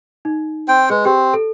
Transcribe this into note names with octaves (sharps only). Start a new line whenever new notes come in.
D#4
C4 G5
G#3 G#4 B4
C4 G4
A4